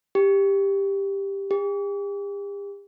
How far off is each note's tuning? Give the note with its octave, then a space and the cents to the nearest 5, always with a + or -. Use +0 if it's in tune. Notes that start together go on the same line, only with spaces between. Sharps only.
G4 +10
G4 +45